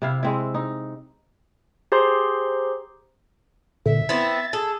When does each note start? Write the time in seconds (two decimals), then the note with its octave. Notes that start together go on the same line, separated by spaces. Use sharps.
0.02 C3 E4 F5
0.23 G#3 C4 E4
0.54 D#4
1.92 G4 G#4 C5 A#5 C6
3.86 A#2 D3 E5
4.09 B3 C4 E4 A6
4.53 G#4 A4